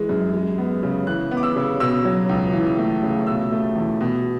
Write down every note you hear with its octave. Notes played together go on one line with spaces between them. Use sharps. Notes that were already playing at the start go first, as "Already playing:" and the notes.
Already playing: E3 G#3
F#2
G#3
B3
C#3
E3 F#6
B3
D6
E6
C#3
B2 E6
F#3
C#2
E3
A3
C#3
B2 E6
A3
E2
B2